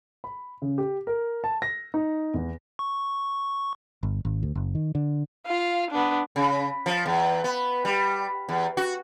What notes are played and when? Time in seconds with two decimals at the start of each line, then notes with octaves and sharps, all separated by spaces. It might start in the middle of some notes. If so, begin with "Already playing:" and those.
0.24 B5
0.62 C#3
0.78 G4
1.07 A#4
1.44 A5
1.62 A#6
1.94 D#4
2.34 E2
2.79 C#6
4.03 G1
4.25 G#1
4.43 D2
4.55 F#1
4.75 D#3
4.95 D3
5.47 F4 F5
5.91 B3 D4
6.36 C#3
6.86 F3
7.06 E2
7.44 B3
7.85 G3
8.49 E2
8.77 F#4